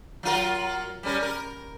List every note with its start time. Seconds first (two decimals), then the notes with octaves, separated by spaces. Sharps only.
0.23 F#3 F4 A#4
1.03 G3 C#4 A#4
1.22 A#4